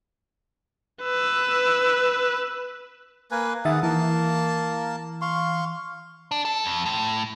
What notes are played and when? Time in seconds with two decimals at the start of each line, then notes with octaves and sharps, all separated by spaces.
1.04 B4 E6
3.31 A#3 B4 G#5
3.65 D#3 G#4 E5 F#5 A6
3.83 E3 A#3 A5
5.21 F5 C6 C#6
6.31 D4
6.45 A4
6.64 F2
6.86 A2